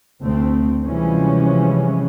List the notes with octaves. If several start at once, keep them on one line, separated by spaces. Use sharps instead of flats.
D2 A3 C4
C3 E3 F3 G3 G#3 C#4